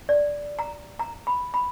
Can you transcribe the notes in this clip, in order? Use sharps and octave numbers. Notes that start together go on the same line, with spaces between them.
D5
A#5
A#5
B5
B5